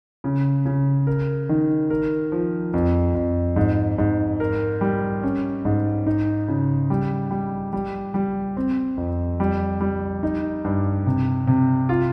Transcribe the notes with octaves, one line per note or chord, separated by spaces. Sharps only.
C#3
C#3
A#4
D#3
A#4
F3
F2
F2
G#2
G#2
A#4
G3
C#4
G#2
D#4
C#3
G3
G3
G3
G3
C4
F2
G3
G3
D#4
G2
C3
C3
F4